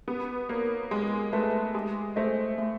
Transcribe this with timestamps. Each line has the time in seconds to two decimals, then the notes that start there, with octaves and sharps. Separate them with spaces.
0.08 B3 G4
0.49 A#3 A#4 C#5
0.91 G#3 G4
1.33 A3 B4 E5 A5
1.75 G#3 G4
2.16 A3 C5 D#5
2.58 A3